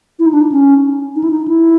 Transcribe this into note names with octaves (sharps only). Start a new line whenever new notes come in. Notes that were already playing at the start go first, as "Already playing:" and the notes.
E4
D#4
D4
D#4
C#4
D#4
E4
D#4
E4